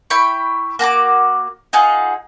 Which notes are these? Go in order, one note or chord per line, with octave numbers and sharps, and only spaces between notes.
E4 G5 B5 C#6
A#3 F#4 A#5 D6
D#4 F4 G#4 F#5